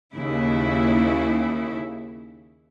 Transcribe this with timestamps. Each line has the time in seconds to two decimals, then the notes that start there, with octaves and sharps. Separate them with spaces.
0.15 D#2 C#3 E4